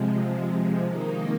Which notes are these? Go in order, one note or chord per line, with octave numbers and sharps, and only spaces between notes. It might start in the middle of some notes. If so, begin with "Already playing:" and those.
Already playing: C3 F3 G#3
D#3 A#3 D#4